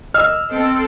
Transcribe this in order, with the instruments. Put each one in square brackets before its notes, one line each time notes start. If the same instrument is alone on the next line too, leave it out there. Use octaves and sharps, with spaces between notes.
[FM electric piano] D#5 E6 [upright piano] F6
[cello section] C4 A4